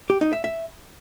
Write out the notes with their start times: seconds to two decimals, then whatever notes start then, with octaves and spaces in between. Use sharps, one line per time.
0.10 G4
0.21 D#4
0.33 E5
0.44 E5